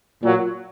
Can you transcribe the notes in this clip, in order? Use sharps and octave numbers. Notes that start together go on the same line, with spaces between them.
A#2 F#3